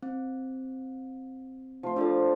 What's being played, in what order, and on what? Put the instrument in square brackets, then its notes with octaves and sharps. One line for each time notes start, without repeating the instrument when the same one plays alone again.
[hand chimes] C4
[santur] F3 A3 C5
[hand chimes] D4 F4 A4 [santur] D5 F5 A5